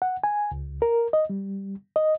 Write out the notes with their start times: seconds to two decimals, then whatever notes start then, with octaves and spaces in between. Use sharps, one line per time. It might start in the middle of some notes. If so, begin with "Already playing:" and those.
0.02 F#5
0.24 G#5
0.52 C#2
0.82 A#4
1.13 D#5
1.30 G3
1.96 D#5